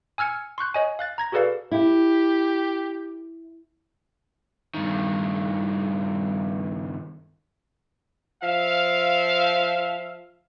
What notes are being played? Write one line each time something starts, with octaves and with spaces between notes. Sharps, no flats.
G#5 E6 F6 G#6 C#7
C6 C#6 F#6 G6
C#5 D#5 G#5
F5 F#6 A6
A#5 G#6 A#6
F#4 G#4 A4 B4 D5 F5
E4 G4
G2 D#3
F3 E5 F5